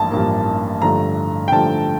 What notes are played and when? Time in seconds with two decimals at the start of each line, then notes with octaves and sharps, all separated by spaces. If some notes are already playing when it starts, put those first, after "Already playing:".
Already playing: A1 G2 F3 A#3 A5
0.11 A1 G2 F3 A#3
0.82 G2 D3 F3 A3 A#5
1.48 G5
1.52 G2 D3 F3 A3 A5